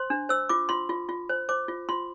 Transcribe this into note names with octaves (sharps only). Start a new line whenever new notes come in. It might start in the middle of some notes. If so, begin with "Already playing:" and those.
Already playing: C5 C6
D4
C5 E6
F4 D6
F4 C6
F4
F4
C5
C5 D6
F4
F4 C6